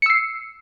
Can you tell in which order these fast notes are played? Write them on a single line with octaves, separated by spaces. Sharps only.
C#7 E6 C7